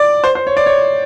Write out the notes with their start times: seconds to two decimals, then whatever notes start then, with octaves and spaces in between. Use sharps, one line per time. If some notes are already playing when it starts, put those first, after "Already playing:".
Already playing: D5
0.24 C5
0.35 C5
0.47 C#5
0.57 D5
0.66 C#5